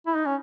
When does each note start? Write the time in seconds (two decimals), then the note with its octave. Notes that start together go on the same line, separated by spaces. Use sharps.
0.07 E4
0.16 D#4
0.26 C#4